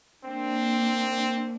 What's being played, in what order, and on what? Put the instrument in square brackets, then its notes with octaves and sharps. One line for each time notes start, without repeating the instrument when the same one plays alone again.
[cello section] A#3 D4 [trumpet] C4